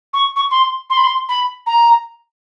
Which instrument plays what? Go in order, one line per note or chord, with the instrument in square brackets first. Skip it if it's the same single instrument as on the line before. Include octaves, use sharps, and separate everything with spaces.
[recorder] C#6
C#6
C6
C6
B5
C6
B5
A#5